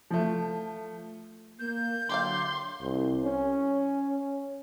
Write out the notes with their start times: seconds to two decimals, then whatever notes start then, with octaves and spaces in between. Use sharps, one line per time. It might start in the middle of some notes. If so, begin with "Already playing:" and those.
0.11 F3 A3
1.59 A#3 G6
2.10 D3 F#3 G4 D5 F5 C6
2.82 C2
3.24 C#4